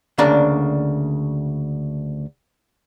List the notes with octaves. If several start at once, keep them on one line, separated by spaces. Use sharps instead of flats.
D2 C#3 A#3 D4 A#5